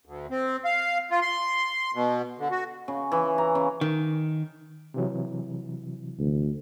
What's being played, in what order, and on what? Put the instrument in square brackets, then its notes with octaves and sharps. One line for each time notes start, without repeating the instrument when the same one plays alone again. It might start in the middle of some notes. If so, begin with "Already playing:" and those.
[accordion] D2
C4
F5
F4
C6
B2
D3
F#4
[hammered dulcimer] C#3
E3
A#5
C#3
[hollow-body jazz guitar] D#3
[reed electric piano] C3 E3 F#3
[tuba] D2